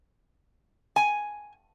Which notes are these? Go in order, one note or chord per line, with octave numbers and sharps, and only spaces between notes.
G#5